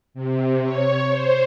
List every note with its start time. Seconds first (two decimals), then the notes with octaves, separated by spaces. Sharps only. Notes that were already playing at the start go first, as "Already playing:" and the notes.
0.14 C3
0.63 C#5
1.09 C5